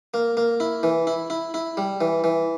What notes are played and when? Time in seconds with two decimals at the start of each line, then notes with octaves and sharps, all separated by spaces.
0.14 A#3
0.37 A#3
0.60 E4
0.83 E3
1.07 E4
1.30 E4
1.54 E4
1.77 G3
2.01 E3
2.24 E3